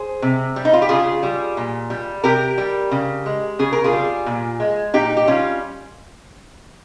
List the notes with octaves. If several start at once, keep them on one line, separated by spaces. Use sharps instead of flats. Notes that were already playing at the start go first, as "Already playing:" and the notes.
Already playing: G#4 C5
C3
G3
D#4
F4
G4
C#3 F4 G#4
G3
A#2
G3
C3 G4 A#4
G3
C#3
G#3
C#3 G#4
A#4
F4 G#4
G3
A#2
G#3
A#2 D#4 G4
G4
G3 C#4 F4